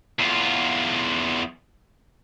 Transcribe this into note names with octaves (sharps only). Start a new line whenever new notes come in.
E2 F4